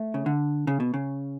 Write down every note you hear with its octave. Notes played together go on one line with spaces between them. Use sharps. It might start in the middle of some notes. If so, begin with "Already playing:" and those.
Already playing: A3
C#3
D3
C#3
B2
C#3